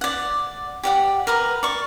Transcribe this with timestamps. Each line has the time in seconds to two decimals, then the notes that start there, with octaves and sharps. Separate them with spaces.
0.01 D5 F#5
0.83 G4 D5 F#5
1.27 A#4 B4 A#5
1.63 D5 C#6